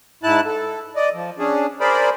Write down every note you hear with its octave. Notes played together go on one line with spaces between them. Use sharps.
G#2 E4 A5 F#6
A4
D5 D#5
F3
C#4 D4 G#4
G#4 A#4 C5 D5 B5